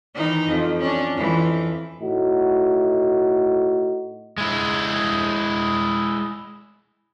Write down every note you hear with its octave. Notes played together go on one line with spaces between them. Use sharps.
D#3 E3 D#4
F2
C#4 D4
F2 E3
A2 D#4 F#4
G#3 E4